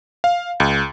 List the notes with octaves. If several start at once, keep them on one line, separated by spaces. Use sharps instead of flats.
F5
C#2